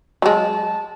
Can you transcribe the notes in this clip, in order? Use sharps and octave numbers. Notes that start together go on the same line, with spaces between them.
F#3 G#3 A5